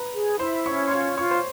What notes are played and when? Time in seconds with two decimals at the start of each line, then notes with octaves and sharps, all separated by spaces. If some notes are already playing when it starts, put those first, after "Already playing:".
Already playing: B4 A#5
0.14 G#4
0.39 E4 C5 C6
0.65 C#4 C#5 C#6
0.88 C6
0.91 F4 C#5 C#6
1.17 F4 C#5 C#6
1.31 C5 C6